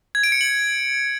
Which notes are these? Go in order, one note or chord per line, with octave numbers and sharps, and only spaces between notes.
G#6
D7
C#7
F#7